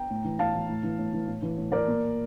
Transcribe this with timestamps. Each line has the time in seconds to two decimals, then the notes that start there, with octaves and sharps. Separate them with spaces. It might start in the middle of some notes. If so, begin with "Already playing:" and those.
Already playing: G5 A#5
0.10 A2
0.24 E3
0.39 A2 F5 A5
0.54 E3
0.68 A2
0.83 E3
0.98 A2
1.13 E3
1.27 A2
1.42 E3
1.57 A2
1.72 E3 A#4 D5
1.87 A#2